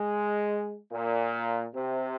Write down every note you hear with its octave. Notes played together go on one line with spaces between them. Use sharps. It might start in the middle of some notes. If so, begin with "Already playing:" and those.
Already playing: G#3
A#2
C3